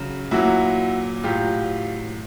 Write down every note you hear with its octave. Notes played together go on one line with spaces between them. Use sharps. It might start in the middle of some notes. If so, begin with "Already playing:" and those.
Already playing: C#3 F#3
A#2 F#3 E4 F#4
A2 F#3 F4 G4